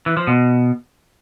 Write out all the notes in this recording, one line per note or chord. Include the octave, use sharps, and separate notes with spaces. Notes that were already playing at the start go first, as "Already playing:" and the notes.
E3
F3
B2